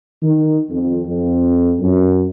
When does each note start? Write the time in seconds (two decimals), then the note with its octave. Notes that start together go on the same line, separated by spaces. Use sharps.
0.23 D#3
0.70 F2
1.06 F2
1.80 F#2